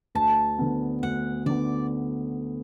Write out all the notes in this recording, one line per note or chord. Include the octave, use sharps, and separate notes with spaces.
D2 A5
D3 B3
D2 F#5
D3 B3 D5